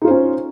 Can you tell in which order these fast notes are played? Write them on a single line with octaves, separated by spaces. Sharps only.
D#4 F4 C5 C#4